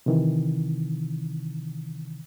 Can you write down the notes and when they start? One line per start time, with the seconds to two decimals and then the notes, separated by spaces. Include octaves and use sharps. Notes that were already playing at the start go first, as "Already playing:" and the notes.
0.06 C3 D#3 E3